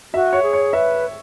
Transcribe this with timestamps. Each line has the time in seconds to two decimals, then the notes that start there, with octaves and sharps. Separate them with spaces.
0.14 F#4 E5
0.33 C#5
0.43 G#4
0.53 C#5
0.73 B4 E5